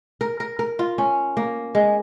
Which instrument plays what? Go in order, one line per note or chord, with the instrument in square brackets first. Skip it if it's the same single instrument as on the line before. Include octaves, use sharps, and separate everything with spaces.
[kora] A#4
A#4
A#4
F4
C#4
A#3
G#3